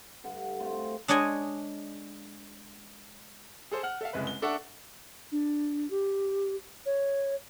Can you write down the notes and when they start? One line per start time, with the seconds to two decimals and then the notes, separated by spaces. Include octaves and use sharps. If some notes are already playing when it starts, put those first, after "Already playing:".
0.24 G2 D3 F#5
0.60 A3 C4 F4 F#4
1.08 G#3 D4 C#5 D#5 G#5
3.71 G#4 A4 C5
3.83 F#5 F6
4.01 A4 E5 F5
4.13 F#1 C2 G#3 B4
4.27 G7
4.42 D4 A4 D5 E5 F#5 C#6
5.32 D4
5.90 G4
6.86 C#5